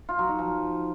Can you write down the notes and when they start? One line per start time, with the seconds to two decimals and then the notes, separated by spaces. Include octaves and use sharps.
0.09 F4
0.19 F#3
0.29 D#4
0.39 F3